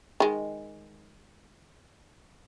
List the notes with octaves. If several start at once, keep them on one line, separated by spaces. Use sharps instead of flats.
D#3 G#3